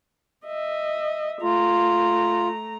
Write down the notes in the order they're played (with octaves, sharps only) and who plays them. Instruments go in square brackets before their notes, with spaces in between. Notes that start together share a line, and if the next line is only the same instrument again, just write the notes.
[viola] D#5 E5
[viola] A3 A#5 [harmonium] F4